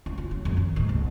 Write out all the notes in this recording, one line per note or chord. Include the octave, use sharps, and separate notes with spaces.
E4
F4
F#3
F2
D#3
G#2
C2